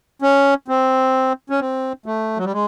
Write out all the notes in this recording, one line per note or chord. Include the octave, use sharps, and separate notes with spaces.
C#4
C4
C#4
C4
A3
F#3
G3
G#3